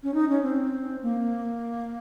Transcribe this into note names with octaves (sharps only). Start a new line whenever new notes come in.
C#4
D#4
C#4
C4
A#3